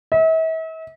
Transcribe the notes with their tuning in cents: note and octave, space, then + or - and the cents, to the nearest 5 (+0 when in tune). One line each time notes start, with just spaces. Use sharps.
E5 -40